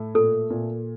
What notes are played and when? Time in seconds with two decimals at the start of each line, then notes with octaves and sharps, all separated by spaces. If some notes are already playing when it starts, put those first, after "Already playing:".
Already playing: A2 A3
0.15 A#2 A4
0.50 A#2